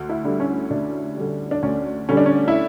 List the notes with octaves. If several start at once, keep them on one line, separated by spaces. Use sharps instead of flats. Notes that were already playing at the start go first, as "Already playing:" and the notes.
Already playing: D2
E4
D3 G3
C#4
D2 D4
D3 G3
D4
D2 C#4
D3 G3 C#4
D4
C#4
E4